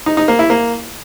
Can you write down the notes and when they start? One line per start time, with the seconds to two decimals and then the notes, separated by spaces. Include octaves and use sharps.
0.06 D#4
0.17 D#4
0.28 A#3
0.39 E4
0.50 A#3